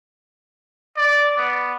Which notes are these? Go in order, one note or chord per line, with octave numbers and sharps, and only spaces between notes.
D5
B3